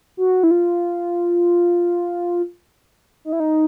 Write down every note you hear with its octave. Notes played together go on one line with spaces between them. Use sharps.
F#4
E4
F4
D#4
E4
D#4